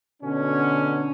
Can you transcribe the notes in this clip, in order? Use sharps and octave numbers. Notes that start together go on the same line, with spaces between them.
B2 D3 C#4